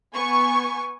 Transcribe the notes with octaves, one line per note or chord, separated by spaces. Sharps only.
B3 G#5 C#6